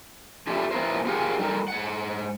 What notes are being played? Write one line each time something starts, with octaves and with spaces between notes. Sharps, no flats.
F4 G4 A4 D5 E5
B3 E4 F4 A#4 C5
F4 G4 G#4 A#4 F5 F#5
G3 D#4 A4 A#4
G#2 F#5